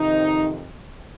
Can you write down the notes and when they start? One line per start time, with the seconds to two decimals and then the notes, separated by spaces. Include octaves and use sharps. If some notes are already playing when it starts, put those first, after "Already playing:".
Already playing: F2 C3 D#3 D#4